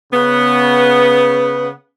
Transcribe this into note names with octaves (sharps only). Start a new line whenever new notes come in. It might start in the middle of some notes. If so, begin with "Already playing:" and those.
C#3 B3